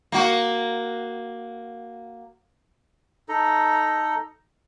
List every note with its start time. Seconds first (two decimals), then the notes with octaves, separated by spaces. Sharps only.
0.12 A#3 F#4
3.29 D#4 A4 A#5